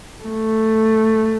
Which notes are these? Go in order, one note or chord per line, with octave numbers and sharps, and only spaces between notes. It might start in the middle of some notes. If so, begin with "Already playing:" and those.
A3